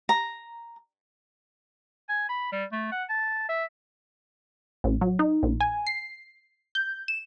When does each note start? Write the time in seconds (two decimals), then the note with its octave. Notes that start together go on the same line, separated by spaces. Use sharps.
0.09 A#5
2.09 G#5
2.29 B5
2.52 G3
2.72 A3
2.92 F#5
3.09 A5
3.49 E5
4.84 A1
5.01 F#3
5.19 D#4
5.43 A#1
5.61 G#5
5.87 C7
6.75 G6
7.08 E7